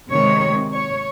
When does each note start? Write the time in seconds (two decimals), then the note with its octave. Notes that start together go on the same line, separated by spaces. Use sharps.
0.12 C3 D#3 G#3 C#5
0.72 C#5